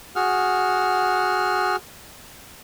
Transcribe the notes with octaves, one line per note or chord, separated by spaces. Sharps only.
F#4 G#4 F#5 F6